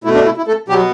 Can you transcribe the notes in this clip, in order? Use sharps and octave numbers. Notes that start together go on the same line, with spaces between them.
B2 A3 E4
D4
E4
E4
A3 A4
B2 F#3 G3 B3 G4